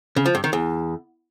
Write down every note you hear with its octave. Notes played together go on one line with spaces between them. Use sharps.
C#3
F3
G2
D#3
E2